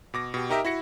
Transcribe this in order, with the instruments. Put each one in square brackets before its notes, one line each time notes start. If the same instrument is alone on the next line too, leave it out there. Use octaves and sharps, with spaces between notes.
[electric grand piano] B2 D6 A#6
B2 G4
D#4 G4 A#4 D#5 E5
E4 F#4 A#6 C#7